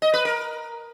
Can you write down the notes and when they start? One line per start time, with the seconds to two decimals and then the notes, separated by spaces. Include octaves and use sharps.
0.02 D#5
0.14 B4
0.25 A#4